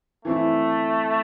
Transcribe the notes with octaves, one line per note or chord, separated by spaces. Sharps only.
E3 A3 C4 E4